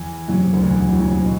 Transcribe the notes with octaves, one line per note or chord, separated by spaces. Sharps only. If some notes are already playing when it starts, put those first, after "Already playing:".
Already playing: E2 E3
F#2 F#3
C3
D2 D3
E2 E3
E2 E3
F#2 F#3
F#2 F#3
C3
B2